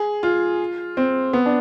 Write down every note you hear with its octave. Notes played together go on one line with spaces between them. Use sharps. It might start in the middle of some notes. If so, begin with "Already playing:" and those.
Already playing: G#4
F4
C4
B3
D4